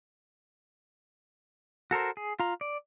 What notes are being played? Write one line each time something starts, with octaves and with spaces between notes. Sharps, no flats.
F#4 A4 A#4 C5
G#4
F4 A#5
D5